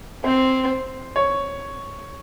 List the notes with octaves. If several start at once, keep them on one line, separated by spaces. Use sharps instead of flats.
C4 C5
C#5